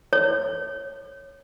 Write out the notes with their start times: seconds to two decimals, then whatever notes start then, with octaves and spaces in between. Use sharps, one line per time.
0.13 C#5